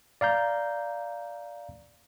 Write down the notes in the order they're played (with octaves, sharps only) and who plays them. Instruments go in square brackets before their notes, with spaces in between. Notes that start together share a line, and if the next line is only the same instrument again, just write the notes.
[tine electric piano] D5 F5 A#5 G6